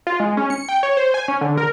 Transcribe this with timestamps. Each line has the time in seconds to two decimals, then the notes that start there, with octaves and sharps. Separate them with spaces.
0.07 F4
0.20 G#3
0.37 C#4
0.50 C#7
0.69 G5
0.83 C#5
0.97 C5
1.14 G#5
1.28 C#4
1.41 D3
1.57 A#4